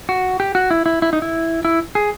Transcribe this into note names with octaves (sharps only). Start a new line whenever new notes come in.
F#4
G4
F#4
E4
E4
E4
D#4
E4
E4
G#4